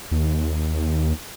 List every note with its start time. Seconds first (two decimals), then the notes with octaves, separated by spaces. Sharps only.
0.11 D#2